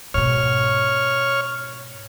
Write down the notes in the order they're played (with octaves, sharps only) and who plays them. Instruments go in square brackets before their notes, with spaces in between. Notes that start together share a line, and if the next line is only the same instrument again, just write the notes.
[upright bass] G#2 B2 [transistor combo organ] C#5 F6